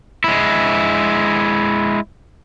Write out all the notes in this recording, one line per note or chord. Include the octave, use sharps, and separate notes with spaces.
G#3 E4